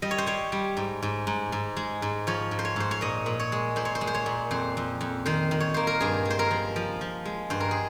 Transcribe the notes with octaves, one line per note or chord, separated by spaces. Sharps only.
G3 D#5
C#5
C5
G3 C#5
G3
G#2
G#2
G#2
G#2
G#3
G#2
F3 C#5
G#2
C5
C#5
G#2 C5
C#5
A#2 D#5
A#2
C#5
G#3
A#2 C5
C#5
C5
G#3
C5
C#5
A#2
F2 C5
F2
F2
D#3 C5
D#3
C#5
A#3 C5
A#4
G2 G#4
G#3
C5
A#4
F3
F3
F3
G#3
G2 C5
A#4
G#4